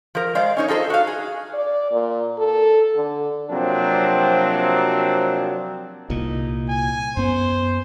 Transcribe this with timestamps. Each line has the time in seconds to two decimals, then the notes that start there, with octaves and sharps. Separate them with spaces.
0.15 F3 A#4
0.35 G#3 C5 D5 F5
0.57 C#4 D#4 C#5
0.68 D#4 F4 A4 C5
0.90 F#4 F5
1.07 G#4
1.54 D5
1.92 A#2
2.38 A4
2.95 D3
3.50 C3 F3 F#3 A#3 C4 D4
6.10 C2 A#2 D#4
6.69 G#5
7.17 F#2 B3 C5